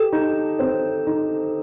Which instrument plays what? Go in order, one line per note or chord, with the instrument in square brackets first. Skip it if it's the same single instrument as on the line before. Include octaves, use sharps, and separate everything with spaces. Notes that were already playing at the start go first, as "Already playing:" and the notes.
Already playing: [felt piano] G4 [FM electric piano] A4
[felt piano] D#4
C4
D#4